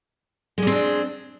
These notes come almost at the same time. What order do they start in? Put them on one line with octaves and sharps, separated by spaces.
G#3 G3 C4 D4